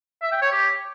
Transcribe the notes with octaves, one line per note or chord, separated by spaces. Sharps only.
E5
G5
C#5
G4